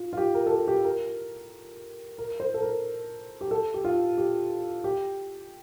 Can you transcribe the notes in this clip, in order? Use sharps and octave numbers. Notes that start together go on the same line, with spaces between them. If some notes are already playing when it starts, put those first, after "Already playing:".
Already playing: F4
F4
G4
A#4
A4
G4
G4
A#4
A#4
C5
A4
A#4
G4
A4
G4
F4
G4
G4